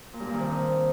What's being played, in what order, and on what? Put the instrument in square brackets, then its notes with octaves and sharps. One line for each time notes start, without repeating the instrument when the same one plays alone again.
[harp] A#2
G2
A#2
D#3
C3